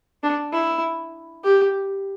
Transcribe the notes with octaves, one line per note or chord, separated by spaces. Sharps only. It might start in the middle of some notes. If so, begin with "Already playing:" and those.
D4
E4
G4